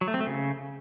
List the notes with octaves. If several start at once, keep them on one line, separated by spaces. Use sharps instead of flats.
F#3
A3
C4
A3
C#3